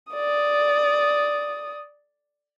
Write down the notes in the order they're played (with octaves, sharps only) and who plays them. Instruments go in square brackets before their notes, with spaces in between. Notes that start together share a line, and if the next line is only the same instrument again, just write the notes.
[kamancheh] D5 D#6